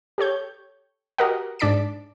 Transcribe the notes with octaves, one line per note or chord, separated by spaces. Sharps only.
G4 A4 C#5 G6
F#4 G4 A#4 D#5 F#5
G#2 D4 D5 A5 B6 D7